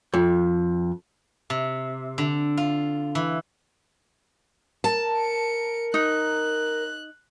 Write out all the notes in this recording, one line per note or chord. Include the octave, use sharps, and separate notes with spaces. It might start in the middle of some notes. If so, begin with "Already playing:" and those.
F2
C3
D3
F4
E3
A#4 A5
C#7 D7
D#4 F#6